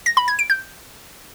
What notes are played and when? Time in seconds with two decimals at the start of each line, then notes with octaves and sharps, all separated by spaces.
0.06 A#6
0.17 B5
0.28 G#6
0.39 D7
0.50 G6